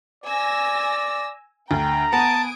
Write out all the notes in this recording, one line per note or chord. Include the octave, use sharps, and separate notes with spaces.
D5 G#5 E6 A#6
D2 G5 A#5
B3 G#5 A5 D#6 D7